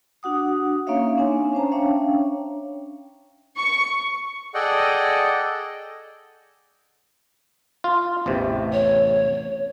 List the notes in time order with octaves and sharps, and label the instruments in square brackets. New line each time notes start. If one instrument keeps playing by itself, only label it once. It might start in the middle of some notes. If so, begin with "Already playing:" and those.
[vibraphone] D4 F#4 F#5 D#6
A#3 C#4 D#4 C#5 E5 F5
C4 D4 C#5 G#5
C#4 C5 A5 A#5
C#4 D4 C#5 E5 F5 G5
[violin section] C#6
[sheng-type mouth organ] G#4 A4 D5 D#5 F#5 G5
[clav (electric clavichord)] F4
A1 E2 C3
[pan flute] C#5